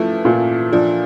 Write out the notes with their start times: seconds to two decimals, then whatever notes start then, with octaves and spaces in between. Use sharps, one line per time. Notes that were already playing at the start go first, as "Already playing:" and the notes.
Already playing: E3 F3 A3
0.25 A#2
0.72 F3 D4